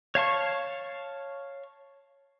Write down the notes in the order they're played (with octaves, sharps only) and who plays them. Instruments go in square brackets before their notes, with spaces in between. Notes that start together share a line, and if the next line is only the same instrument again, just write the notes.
[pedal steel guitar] C#5 F5 A5 C#6